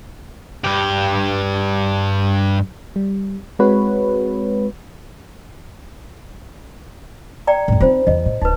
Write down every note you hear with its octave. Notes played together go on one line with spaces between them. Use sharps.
G2 G4
G3
G#3 C4 F#4 B4 C#5
D5 G5 A#5
F2 A2
C4 D#4 F4 C5
E2 E3 D#5
A2
D1 D#4 B4